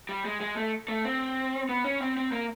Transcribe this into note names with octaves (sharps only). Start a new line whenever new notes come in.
G3
G#3
G#3
A3
A3
C4
B3
C#4
C4
C4
A#3